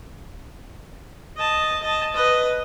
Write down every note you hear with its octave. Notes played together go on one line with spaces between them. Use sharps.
D#5 A5
D#5 A5
B4 D#5